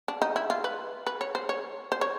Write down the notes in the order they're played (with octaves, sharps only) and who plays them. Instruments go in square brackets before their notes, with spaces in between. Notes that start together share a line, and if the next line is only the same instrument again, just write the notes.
[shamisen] D4
D#4
E4
F4
B4
B4
C#5
C5
C#5
C5
C#5